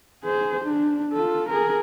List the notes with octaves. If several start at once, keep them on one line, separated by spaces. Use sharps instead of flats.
G#4 C5
D4
F4 A4
G#4 A#4